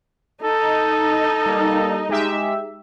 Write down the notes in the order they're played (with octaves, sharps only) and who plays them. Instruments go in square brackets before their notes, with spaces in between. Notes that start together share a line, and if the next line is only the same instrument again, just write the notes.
[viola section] D#4 [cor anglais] A4
[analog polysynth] G3 A#3
G#3 G4 E5